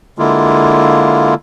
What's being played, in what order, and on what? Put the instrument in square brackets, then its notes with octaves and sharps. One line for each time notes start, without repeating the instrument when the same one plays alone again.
[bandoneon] D3 G#3 A#3 E4 F4